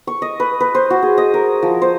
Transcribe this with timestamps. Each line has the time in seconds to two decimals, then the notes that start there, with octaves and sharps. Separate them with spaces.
0.07 C#6
0.22 D#5
0.40 B4
0.60 B4
0.75 C5
0.90 F#4
1.02 G#4
1.18 D#5
1.34 A#4
1.62 F3
1.82 C5